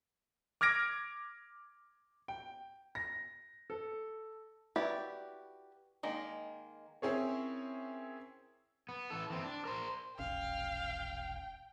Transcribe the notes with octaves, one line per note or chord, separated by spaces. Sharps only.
D6 F6 G#6 A#6 D7
G5
A#6
A4
E4 F#4 G4 B4 D5
D#3 G#3 A#3
C4 C#4 E4 G#4 A#4 C#5
B3
E3 A4
E3 C4
D4
A#4 C5
E1 A#1 C#4 F5 G5